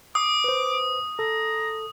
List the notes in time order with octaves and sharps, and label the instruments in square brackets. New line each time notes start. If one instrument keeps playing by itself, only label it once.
[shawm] D6 [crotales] D#6
[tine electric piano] B4 C5
[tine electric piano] A4 [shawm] A#5